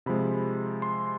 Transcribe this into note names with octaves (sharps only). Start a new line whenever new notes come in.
C3 F3 G#3 B5
C6